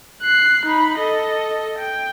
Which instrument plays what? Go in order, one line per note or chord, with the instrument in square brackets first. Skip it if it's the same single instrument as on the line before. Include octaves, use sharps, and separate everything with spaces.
[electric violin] F#6 C7
D#4 B5
A4 D#5
G5